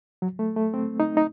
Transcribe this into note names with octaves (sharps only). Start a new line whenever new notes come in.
F#3
A3
A3
C4
D#4
D#4